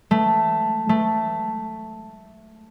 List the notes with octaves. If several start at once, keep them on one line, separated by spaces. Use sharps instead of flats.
A3
A3